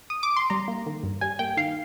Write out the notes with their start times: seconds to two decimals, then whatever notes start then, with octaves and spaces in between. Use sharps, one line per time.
0.10 D#6
0.23 D6
0.36 C6
0.50 G3 A#5
0.68 A#3
0.86 D#3
1.03 G2
1.21 G3 G#5
1.39 A#3 G5
1.57 D#3 F5